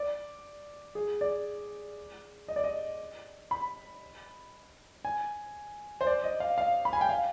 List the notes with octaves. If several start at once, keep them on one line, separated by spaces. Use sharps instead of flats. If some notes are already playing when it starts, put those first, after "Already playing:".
Already playing: D5
G#4
D5
D#5
D5
D#5
B5
G#5
C5
D5
D#5
F5
F5
B5
G#5
G5
F5